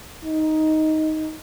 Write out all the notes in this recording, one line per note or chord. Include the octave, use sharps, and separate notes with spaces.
D#4